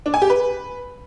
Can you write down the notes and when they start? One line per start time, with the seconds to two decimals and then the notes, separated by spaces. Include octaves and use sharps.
0.06 D4
0.14 G#5
0.22 G4
0.30 B4